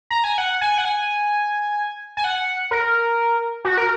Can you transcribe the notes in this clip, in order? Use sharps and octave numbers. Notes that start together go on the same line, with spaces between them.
A#5
G#5
F#5
G#5
F#5
G#5
G#5
F#5
A#4
F#4
A#4